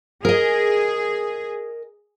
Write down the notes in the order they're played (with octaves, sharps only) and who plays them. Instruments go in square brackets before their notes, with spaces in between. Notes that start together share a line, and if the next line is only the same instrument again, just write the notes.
[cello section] G#4 [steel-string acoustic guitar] A#4 D#5